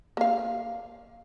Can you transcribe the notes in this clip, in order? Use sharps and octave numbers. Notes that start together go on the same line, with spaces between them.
A#3 F5